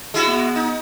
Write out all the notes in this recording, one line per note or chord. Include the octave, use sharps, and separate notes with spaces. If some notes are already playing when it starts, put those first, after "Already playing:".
G#3 E4 F#4
B3
D#4